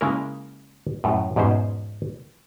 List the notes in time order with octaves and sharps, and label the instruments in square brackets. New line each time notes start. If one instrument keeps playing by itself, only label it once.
[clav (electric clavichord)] C#3 G#3 A#3 E4 A#4
F#2 A2
E2 G#2 B2 C#4 C5